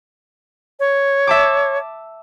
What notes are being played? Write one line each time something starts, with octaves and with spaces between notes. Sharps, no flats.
C#5
E5 A5 D6